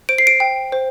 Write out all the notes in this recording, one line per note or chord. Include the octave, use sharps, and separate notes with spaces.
C5 D7
C7
D7
G5
C5